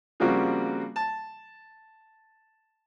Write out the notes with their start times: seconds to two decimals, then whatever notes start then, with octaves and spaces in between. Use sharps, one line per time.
0.20 C#3 F3 G3 A#3 C4 F#4
0.96 A5